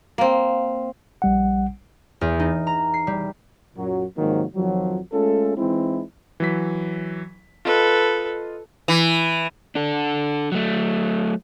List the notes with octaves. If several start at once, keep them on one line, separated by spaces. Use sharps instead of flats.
A#3 C4
A#1 G3 F#5
E2
D#4
A#5
C7
G3
F#2 A#2 F#3
G#2 C3 D#3 F3 F#3 A#3
F2 D#3 F3 F#3
G#3 A3 C#4 F4 A4
E3 G#3 C4 D#4 E4
E3 F#3 B6
F4 A4 B4 D#5
E3
D4 A4
F#3 A3